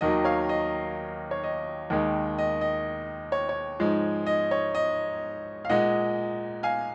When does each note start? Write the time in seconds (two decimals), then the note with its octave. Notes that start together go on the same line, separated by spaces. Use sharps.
0.01 D#2 D#3 F#3 D#5
0.24 C#5 F5
0.49 D#5
1.31 C#5
1.44 D#5
1.90 D#2 D#3 G#3
2.38 D#5
2.61 D#5
3.32 C#5
3.49 C#5
3.79 G#2 F3 G#3
4.26 D#5
4.51 C#5
4.75 D#5
5.65 F5
5.69 A#2 G#3 D#5 F#5
6.63 F5 G#5